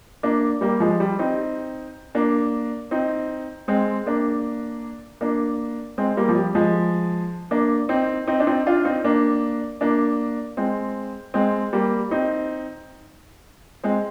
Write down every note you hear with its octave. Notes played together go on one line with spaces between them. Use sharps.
A#3 D4
G3 A#3
F3 G#3
G3
C4 D#4
A#3 D4
C4 D#4
G#3 C4
A#3 D4
A#3 D4
G#3 C4
G3 A#3
F3
G3
F3 G#3
A#3 D4
C4 D#4
C4 D#4
D4
C4 D#4
D4 F4
C4 D#4
A#3 D4
A#3 D4
G#3 C4
G#3 C4
G3 A#3
C4 D#4
G#3 C4